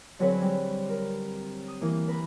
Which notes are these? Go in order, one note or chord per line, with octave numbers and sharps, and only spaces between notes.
D3 F#3 C4 G#4 B4 C#5
G3
A#4
D#6
E3 A#3
B4 A#5 B5